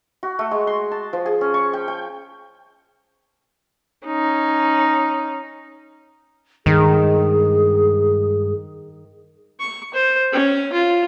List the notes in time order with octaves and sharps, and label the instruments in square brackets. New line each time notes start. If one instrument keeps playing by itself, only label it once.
[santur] F#4
A3
G#3
C6
A5
F3
G#4
C#4
C#6
G5
G5
[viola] C#4 D#4
[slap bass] G2 G#3 [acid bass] D#3 [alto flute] G#4
[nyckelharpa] C#6
C5
C#4
F4